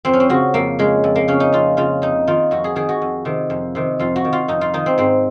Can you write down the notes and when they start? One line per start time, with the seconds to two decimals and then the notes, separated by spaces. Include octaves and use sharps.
0.05 F2 C4
0.13 C#4
0.20 C4
0.29 C#3 F#4
0.54 F2 A#3
0.79 C#3 G#3
1.04 F2
1.16 A#3
1.28 C#3 C#4
1.40 D#4
1.53 F2 F4
1.77 C#3 F4
2.02 F2 D#4
2.27 D#3 F4
2.51 F2 F#4
2.64 G#4
2.76 D#3 G#4
2.89 F#4
3.02 F2
3.25 C3 D#3
3.50 F2
3.75 C3 D#3
3.99 F2 F4
4.16 F#4
4.25 D#3
4.33 F4
4.48 F2 D#4
4.61 F4
4.74 D#3 D#4
4.86 C4
4.98 G#2 C4